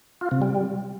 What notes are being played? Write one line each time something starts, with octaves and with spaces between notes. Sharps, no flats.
F4
C3
G3